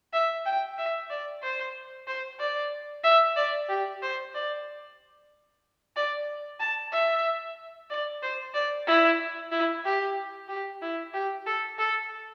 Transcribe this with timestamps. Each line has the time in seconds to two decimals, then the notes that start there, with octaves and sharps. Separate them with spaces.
0.13 E5
0.46 G5
0.78 E5
1.10 D5
1.43 C5
2.07 C5
2.40 D5
3.04 E5
3.36 D5
3.69 G4
4.02 C5
4.35 D5
5.96 D5
6.60 A5
6.92 E5
7.90 D5
8.23 C5
8.54 D5
8.87 E4
9.52 E4
9.85 G4
10.48 G4
10.82 E4
11.14 G4
11.47 A4
11.79 A4